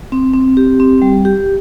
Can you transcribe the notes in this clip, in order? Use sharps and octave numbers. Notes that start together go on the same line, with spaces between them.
C4
C4
G4
C4
G3
G4